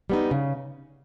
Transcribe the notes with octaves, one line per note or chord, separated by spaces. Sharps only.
G3 B3 D#4
C#3